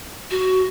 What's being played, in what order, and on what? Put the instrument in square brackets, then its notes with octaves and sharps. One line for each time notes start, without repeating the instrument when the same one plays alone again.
[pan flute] F#4